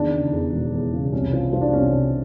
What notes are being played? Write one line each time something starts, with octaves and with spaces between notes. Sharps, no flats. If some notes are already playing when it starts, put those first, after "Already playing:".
Already playing: E2 D#3 D4
C#3
E2
E1
E2
C#3
C2 C#4
F3
F3
D4
C2 C#4
F3